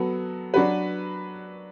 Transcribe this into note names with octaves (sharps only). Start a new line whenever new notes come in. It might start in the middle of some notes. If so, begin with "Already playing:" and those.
Already playing: F#3 B3 F#4 A4
F#3 D4 F#4 B4